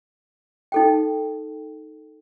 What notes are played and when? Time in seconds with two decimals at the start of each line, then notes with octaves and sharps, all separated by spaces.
0.72 D#4 A4 G5